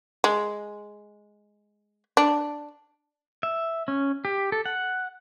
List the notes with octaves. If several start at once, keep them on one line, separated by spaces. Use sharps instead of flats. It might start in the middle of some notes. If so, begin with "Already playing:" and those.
G#3
D4
E5
C#4
G4
A4
F#5